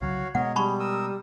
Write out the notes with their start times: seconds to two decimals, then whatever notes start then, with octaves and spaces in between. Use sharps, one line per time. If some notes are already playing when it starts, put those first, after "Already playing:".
0.01 C2 C#3 F#3 F#4 C#5 F5
0.35 B2 G#3 B3 A#4 C#5 D#5 F#5
0.56 G3 G#4 A5 B5 C#6
0.80 A#4 D#6 E6